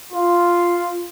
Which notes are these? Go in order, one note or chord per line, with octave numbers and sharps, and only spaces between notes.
F4